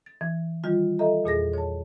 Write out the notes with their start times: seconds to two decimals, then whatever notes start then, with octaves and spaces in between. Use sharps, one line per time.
0.06 A6
0.21 E3
0.64 D#3 G3 F4
0.99 A4 D#5 E5 A#5
1.24 E2 A#2 G#4 A#6
1.53 C#5 A5